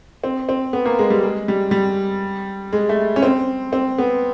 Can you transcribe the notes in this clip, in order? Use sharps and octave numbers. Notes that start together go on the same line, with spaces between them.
C4
C4
B3
A#3
G#3
G3
G#3
G3
G3
G#3
A3
C#4
C4
C4
B3